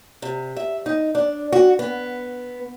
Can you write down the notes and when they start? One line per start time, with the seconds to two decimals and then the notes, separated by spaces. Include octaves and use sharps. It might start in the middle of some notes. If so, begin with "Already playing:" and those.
0.22 C3
0.57 E5
0.86 D#4
1.15 D4
1.52 F#4
1.79 B3